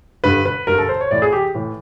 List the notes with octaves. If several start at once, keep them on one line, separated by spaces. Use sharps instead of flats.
G2 D3 B4
B4
G2 D3 A#4
A4
C5
C#5
A2 E3 D5
G#4
G4
A2 E3